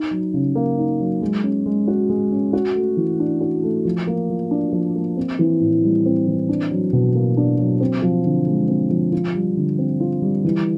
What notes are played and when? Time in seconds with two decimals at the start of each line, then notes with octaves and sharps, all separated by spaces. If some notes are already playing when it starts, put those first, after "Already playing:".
Already playing: D#4
0.11 F#3
0.34 C#3
0.55 A#3
0.78 D#4
1.00 F#3
1.22 G#3
1.43 C#4
1.66 G#3
1.88 F#4
2.09 G#3
2.32 C#4
2.53 F#4
2.75 A3
2.97 E3
3.20 D4
3.41 F#4
3.63 A3
3.85 F3
4.07 A#3
4.30 F3
4.51 D4
4.73 F3
4.95 A#3
5.17 C4
5.39 E3
5.60 A2
5.83 G3
6.06 C4
6.28 E3
6.49 D4
6.71 F#3
6.93 B2
7.15 A#3
7.37 D4
7.59 F#3
7.81 C4
8.02 F3
8.25 D3
8.47 G#3
8.69 C4
8.91 F3
9.12 F4
9.35 G3
9.57 D3
9.78 C4
10.00 F4
10.22 G3
10.45 E3